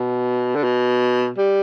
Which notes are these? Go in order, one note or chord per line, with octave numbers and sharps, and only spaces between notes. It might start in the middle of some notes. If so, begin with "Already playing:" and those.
Already playing: B2
D3
B2
G3